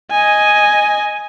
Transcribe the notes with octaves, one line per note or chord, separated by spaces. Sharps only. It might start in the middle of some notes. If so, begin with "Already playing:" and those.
D#5 G#5